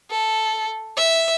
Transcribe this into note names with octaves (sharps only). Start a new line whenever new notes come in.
A4
E5